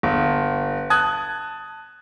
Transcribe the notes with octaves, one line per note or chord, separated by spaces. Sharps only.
G1
A5 D#6 F#6 G#6